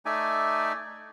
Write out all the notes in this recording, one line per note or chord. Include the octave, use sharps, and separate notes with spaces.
A3 D#4 D5 E5 G#5